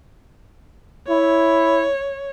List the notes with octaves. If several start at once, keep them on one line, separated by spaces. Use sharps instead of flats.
E4 C#5